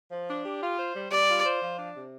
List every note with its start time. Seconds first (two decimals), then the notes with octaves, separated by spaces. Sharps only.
0.11 F3
0.28 D4
0.45 G4
0.61 F4
0.78 C5
0.94 G3
1.11 G3 D5
1.28 F4
1.45 C5
1.61 F3
1.78 D4
1.95 C3